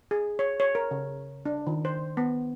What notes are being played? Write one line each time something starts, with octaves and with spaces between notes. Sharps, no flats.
G#4
C#5
C#5
A#4
C#3
D4
D#3
C5
B3